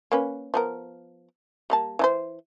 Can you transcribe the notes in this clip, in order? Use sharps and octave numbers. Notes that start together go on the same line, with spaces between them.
A#3 C#4 B4
F3 B3 A#4
G3 A#3 A5
E3 D#4 C5